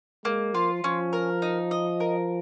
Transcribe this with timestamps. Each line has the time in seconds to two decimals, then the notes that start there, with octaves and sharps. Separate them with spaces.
0.25 G#3 A#3
0.54 F3 F4
0.83 F3 C#4
1.13 A#4
1.42 D#4
1.71 D#5
2.00 A#4